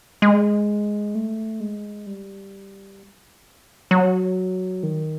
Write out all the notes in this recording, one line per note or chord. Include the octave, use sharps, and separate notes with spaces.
G#3
A3
G#3
G3
F#3
D#3